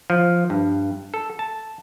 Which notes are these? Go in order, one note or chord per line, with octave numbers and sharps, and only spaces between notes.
F3
G2
A4
A5